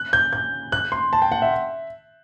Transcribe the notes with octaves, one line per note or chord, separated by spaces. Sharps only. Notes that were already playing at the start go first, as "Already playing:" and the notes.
Already playing: F#6
G6
G6
F#6
C6
A5
G5
F#5
E5